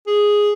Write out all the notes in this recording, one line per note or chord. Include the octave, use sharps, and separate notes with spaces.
G#4